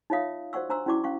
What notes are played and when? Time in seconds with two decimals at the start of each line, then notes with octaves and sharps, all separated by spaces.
0.10 D#4 F4 C#5 E5 F5 D#6
0.53 F#4 C5 D5 F#5 C#6 E6
0.69 D4 C5 A#5 C6 E6
0.86 C#4 E4 F#4 D5 C#6 D6
1.04 C#4 F5 C#6